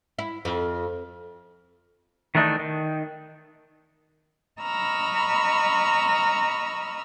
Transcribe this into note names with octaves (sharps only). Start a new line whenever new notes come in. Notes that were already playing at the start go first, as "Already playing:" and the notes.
E4
F2
D#3 E3 A3 D4 D#4
D#3
D#5 A#5 B5 C#6 E6 F6